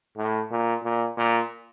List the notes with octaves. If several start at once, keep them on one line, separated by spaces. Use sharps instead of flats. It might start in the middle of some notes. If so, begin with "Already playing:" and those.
A2
A#2
A#2
A#2